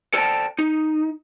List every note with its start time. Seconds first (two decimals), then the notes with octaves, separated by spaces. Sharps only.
0.14 A4 C5 D5 D#5 G5 A5
0.59 D#4